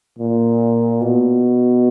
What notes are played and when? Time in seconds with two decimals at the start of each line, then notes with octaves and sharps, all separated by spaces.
0.19 A#2
1.01 B2